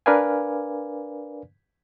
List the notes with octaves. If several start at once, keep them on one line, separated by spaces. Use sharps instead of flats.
D4 A#4 B4 D5 F5 G#5